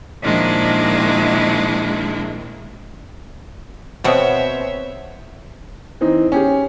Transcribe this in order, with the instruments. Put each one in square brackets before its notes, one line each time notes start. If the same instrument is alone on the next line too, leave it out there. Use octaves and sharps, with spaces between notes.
[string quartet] A#2 D#3 F3 G#3 D4 E4
[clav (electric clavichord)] B2 [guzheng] B3 C4 [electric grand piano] C5 C#5 [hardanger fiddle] E5
[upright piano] E3 C4 D#4
C#4 G4 G#4